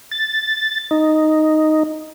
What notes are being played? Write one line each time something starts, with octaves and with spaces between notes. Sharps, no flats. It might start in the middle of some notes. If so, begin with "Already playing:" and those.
A6
D#4